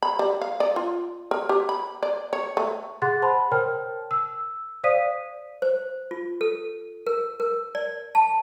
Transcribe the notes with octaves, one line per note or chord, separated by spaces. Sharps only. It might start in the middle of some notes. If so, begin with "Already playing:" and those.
B5
G3
F5
D5
F4
A#4
G4
B5
D5
C#5
A3
G#4 F#5 C6 F#6 A6
C5 A5 B5 C6
A#4 C5 C#5 G5 A5 F6
E6
C5 D5 F5 D#6 B6 D#7
C5
F4
A4
A#4
A#4
D5
A5